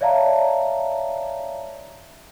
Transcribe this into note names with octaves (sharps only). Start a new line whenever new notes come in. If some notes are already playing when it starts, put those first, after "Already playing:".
C#5 D5 E5 F5 A5 A#5